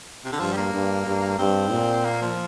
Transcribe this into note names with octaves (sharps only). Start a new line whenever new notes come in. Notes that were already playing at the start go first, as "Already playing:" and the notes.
C3
D3
G2 F3
G3
A#3
G2
G2
G2 C4
A#2
A#3
F3